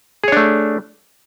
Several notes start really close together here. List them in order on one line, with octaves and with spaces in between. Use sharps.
G#4 C#5 D4 A3